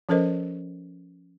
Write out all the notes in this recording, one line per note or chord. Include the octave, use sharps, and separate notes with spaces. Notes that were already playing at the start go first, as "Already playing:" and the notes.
F3 C#4 A4 A#4 C5 D#5